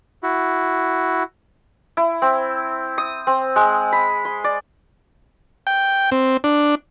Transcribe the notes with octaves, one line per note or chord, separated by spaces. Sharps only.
E4 F#4
E4
C4
D#6
C4
G#3
B5
C6
D5
G5
C4
D4